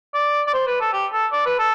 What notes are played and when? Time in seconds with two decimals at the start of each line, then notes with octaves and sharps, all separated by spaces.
0.14 D5
0.47 D5
0.54 C5
0.67 B4
0.81 A4
0.93 G4
1.13 A4
1.32 D5
1.46 B4
1.59 A4